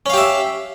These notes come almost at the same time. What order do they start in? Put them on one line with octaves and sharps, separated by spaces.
C#4 F5 G4 E5